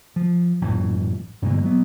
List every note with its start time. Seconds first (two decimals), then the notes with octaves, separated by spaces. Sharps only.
0.16 F3
0.61 A1 F#2 A#2 E3
1.42 G2 B2 D3 G#3
1.63 F#3 B3